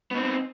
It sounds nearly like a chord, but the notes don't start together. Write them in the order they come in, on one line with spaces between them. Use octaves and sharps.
B3 D#4 C4